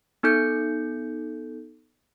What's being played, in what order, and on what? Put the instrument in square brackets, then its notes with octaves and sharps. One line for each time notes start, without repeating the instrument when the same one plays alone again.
[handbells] B3 D#4 A4 G6 C#7